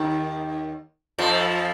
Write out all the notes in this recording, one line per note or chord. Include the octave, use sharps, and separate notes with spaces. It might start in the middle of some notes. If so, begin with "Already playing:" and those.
Already playing: D#2 D#3
F2 F3